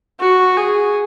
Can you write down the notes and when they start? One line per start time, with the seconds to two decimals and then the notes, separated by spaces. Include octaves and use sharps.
0.20 F#4
0.57 G#4